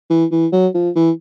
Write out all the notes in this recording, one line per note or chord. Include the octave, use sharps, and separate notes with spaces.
E3
E3
F#3
F3
E3